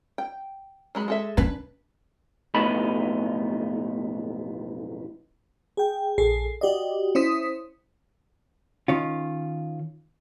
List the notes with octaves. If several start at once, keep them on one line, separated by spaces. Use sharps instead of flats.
G5
F#3 G#3 B5
G#3 A4 E5
C#4 D4 B4
B1 F2 A2 B3 D#4 B5
G#4 G5
A#1 G#4 A4 C7
F#4 G4 D5 D#5
C#4 E4 C5 D#6 B6
D#3 C#4 F4